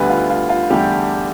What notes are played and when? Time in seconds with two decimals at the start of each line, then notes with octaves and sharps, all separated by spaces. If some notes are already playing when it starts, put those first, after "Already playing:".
Already playing: D2 D3 G3 B3 B4
0.09 F4
0.30 F4
0.49 F4
0.70 E2 D3 G3 A3 G4